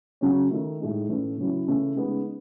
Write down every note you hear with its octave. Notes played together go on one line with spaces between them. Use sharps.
C#3 F#3 C#4
D#3 A3 D#4
A2 G#3 D#4
A2 E3 A3 C#4
C#3 F#3 C#4 E4
C#3 E3 A3 C#4
C#3 G#3 B3 D#4